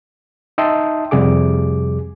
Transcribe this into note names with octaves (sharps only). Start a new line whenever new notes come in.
D#4 D#5 E5 G5 A5 C6
F2 C3 G3 G#4 D6